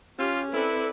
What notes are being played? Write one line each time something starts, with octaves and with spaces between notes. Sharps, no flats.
C#4 F4 G4
C4 E4 A4 B4 D5